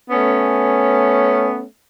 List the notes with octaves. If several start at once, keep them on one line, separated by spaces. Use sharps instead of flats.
A3 B3 C#4